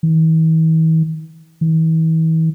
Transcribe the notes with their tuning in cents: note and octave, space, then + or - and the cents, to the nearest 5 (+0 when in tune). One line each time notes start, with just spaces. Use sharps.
E3 -45
E3 -40